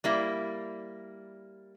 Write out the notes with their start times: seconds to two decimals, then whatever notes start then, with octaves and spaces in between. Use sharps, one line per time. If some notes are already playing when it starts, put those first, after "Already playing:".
0.04 G3 A#3 E4